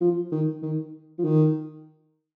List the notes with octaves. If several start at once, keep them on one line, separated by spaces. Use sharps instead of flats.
F3
D#3
D#3
F3
D#3